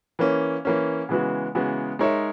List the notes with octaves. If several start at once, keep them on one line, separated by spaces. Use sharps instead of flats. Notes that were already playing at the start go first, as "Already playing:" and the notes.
E3 A#3 C#4
E3 A#3 C#4
C#3 E3 G#3 B3 F#4
C#3 E3 G#3 B3 F#4
G#3 D#4 A#4 C#5 E5